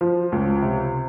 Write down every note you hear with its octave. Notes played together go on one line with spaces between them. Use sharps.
F3
C#2
C3